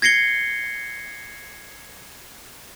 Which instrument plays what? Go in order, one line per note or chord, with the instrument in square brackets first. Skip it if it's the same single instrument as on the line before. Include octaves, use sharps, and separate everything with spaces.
[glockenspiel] G#6 A#6 C7 C#7 G7